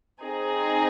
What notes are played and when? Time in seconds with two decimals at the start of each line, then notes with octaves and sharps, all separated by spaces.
0.21 C4 D#4 G#4